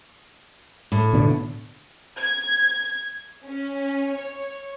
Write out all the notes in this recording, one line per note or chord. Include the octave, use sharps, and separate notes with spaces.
A2
B2 D3
G#6
C#4
C#5